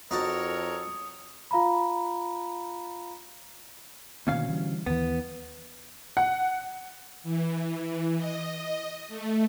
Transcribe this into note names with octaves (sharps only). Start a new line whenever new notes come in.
F2 D#4 F#4 A4 A#4 C#5 A5 D#6
F4 F5 A#5 B5
D2 B2 D#3 A#3 C#4 F5
E3 G3
D#2 E3 B3
F#5
E3
D#5
A3